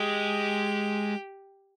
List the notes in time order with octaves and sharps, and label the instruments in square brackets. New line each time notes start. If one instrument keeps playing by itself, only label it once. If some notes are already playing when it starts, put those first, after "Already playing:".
Already playing: [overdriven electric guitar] G#3 [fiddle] G4